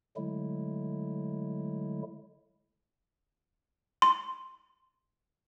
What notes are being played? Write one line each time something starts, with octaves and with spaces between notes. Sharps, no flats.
D3 F#3 G#3 A3 E4
C6